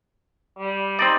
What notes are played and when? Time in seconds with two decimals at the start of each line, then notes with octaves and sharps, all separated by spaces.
0.58 G3
0.99 C4 D#4 D5